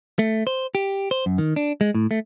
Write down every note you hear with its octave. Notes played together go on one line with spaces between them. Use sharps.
A3
C5
G4
C5
F#2
D#3
D4
G#3
A2
A3